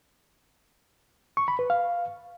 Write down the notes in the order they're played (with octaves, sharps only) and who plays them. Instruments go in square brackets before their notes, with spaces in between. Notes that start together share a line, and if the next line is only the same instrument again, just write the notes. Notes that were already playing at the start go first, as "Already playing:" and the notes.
[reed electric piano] C#6
B5
B4
F5